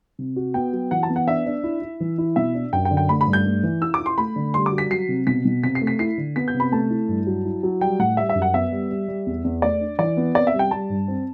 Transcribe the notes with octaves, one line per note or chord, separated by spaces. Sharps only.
C3
F#4
B3 G5
F#3
E3 F#5
A5
B3
F#5
D4 E5
D4
E4
E4
E3
E4
B2 E5
D4
F#2 G5
G5
D3
G5
A3 B5
B5
G2
G6
A3
E3
E4 E6
D6
E4
C6
A3 B5
D3
G3 C6
D6
F#4
B6
F#3 C7
C3
B2 B6
B2
C3 B6
C7
A3
B6
E4 C7
D3
B3 B6
G6
C3
B5
A3 A5
E4
G2
F#3
E4
F#3
G3 G5
A2 F#5
G3 E5
E5
F#2
F#5
B3 E5
G3
G3
G3
E2
E2
A3 D5
D4
E3 D5
B3
C4 D5
E5
G3
G5
G3 A5
G2
C4